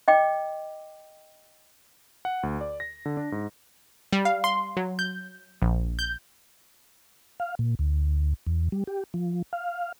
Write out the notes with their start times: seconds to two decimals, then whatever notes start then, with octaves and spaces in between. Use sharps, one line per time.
0.08 D#5 G5 D6
2.25 F#5
2.43 D2
2.61 D5
2.80 A#6
3.06 D3
3.17 D4
3.32 G#2
4.12 G3
4.25 F5
4.44 C6
4.77 F#3
4.99 G6
5.62 A#1
5.99 G6
7.40 F5
7.59 A#2
7.79 D2
8.47 E2
8.72 G3
8.87 G4
9.14 F3
9.53 F5